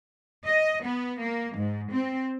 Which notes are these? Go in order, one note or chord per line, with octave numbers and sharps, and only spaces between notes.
D#5
B3
A#3
G#2
C4